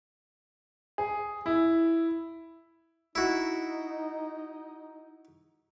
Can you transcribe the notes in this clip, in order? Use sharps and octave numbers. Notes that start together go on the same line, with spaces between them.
G#4
E4
D#4 E4 F#4